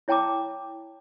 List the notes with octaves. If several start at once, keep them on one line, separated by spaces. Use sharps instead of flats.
E4 C#5 G5 A5 A#5 D6